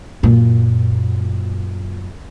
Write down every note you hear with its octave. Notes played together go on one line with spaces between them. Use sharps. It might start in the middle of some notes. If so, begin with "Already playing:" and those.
F#2 A#2